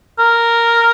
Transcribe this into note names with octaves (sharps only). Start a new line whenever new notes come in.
A#4